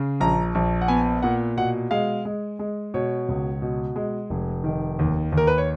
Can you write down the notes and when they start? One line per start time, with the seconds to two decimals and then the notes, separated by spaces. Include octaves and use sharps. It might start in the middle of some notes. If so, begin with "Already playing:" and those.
Already playing: C#3
0.20 A#1 A#5
0.55 A#1
0.81 F#5
0.88 B3 G#5
1.23 A#2 F#5
1.57 B2 F#5
1.91 G#3 F5
2.25 G#3
2.59 G#3
2.94 B2 C#5
3.29 C#2
3.62 B2
3.96 G#3
4.30 F1
4.64 D#3
4.99 D#2
5.32 D#2
5.37 A#4
5.47 B4
5.58 C#5